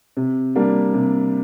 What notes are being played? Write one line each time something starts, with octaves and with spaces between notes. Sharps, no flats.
C3
G3 A#3 D4
C3